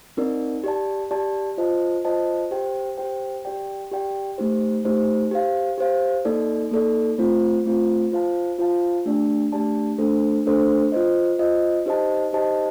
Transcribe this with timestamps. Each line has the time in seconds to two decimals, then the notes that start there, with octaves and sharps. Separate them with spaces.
0.17 C4 D#4 A#4 D5
0.64 G4 D5 A5
1.11 G4 D5 A5
1.58 F4 C5 D#5 A5
2.05 F4 C5 D#5 A5
2.51 G4 C5 G5
2.98 G4 C5 G5
3.45 G4 D5 G5
3.92 G4 D5 G5
4.38 A3 D#4 G4 C5
4.85 A3 D#4 G4 C5
5.31 G4 C5 F5
5.78 G4 C5 F5
6.25 A#3 D#4 A4 D5
6.72 A#3 D#4 A4 D5
7.18 A3 C4 F4 C5
7.65 A3 C4 F4 C5
8.12 F4 C5 F5 A5
8.59 F4 C5 F5 A5
9.06 A3 D4 G4 D5 A5
9.53 A3 D4 G4 D5 A5
9.98 A3 D4 A4 C5
10.46 A3 D4 A4 C5
10.92 F4 C5 D#5
11.39 F4 C5 D#5
11.86 D#4 G4 C5 D#5 A5
12.33 D#4 G4 C5 D#5 A5